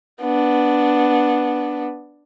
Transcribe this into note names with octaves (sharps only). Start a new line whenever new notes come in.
B3 D4